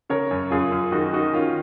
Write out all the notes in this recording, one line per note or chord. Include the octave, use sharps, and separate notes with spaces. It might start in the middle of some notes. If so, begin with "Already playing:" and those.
C#3 A#4 C#5
F#2
F#2 F4 G#4
F#2
D#3 D#4 F#4
D#3 D#4 F#4
D#3 C#4 F4